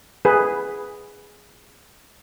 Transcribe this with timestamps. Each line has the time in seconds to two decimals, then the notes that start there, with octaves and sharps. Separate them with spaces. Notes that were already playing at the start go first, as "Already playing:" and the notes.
0.25 G#4 B4